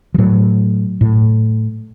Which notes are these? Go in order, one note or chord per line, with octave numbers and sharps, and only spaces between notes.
F3
A2 F#3
A2